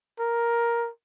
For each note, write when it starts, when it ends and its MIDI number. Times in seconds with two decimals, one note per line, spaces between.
0.20 0.89 70